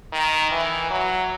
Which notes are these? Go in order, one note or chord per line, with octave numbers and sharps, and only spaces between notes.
D#3
E3
F#3